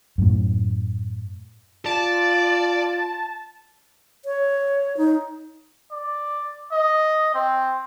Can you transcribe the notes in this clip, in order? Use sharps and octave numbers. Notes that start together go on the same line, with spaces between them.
F#2 A2
F4 D5 A5
C#5
D#4
D5
D#5
C4